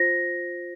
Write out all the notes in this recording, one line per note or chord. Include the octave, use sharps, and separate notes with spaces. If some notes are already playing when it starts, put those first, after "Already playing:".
Already playing: F4 C5 A#6